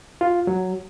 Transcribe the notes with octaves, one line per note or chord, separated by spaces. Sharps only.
F4
F#3